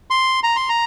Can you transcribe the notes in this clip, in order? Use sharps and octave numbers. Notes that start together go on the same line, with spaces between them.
C6
A#5
C6
A#5